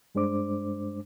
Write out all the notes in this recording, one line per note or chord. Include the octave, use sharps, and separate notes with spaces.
G2 G#3 D4 C5 D6